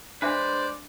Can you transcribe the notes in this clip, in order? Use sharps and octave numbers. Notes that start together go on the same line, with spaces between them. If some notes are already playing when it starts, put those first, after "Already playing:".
G#3 D4 B4 C5 D5 E5 G#5